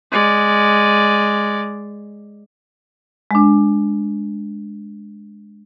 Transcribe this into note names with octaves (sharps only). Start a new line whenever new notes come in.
G#3 D5
G#3 D4